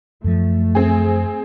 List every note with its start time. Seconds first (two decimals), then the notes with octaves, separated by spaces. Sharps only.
0.24 F#2 F3 A3
0.75 C4 G#4